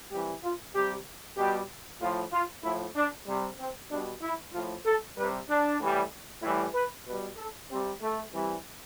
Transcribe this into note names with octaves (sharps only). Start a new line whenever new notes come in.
C3 E3 G3 G4
F4
C3 G3 G4
B2 G3 G4
A2 F3 F4
F4
A2 F3 E4
D4
C3 G3
C4
B2 G3 D4
E4
A2 F3 F4
A4
C3 G3 B4
D4
A2 E3 G3
A2 E3 G3 E4
B4
B2 G3 B4
A4
C3 G3 C4
A3
C3 E3 G3